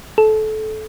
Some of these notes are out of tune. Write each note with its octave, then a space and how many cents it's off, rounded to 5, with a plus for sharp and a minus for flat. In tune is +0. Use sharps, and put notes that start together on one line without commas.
A4 -25